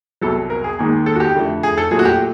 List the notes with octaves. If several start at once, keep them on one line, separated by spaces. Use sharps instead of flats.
C2 B2 F#3 A4
A#4
G#4
D#2 D#3 G#3 G#4
A4
F#4
G4
F2 D3 F3 A3
G#4
A4
A#2 F#3 A3 G#4
F#4
G4